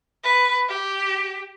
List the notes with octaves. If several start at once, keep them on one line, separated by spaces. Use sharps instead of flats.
B4
G4